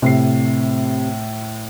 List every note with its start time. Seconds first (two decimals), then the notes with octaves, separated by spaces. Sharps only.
0.02 A2 C3 C7